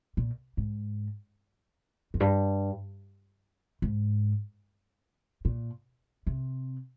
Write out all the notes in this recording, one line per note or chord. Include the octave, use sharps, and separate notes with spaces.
A#2
G#2
F2
G2
G#2
A#2
C3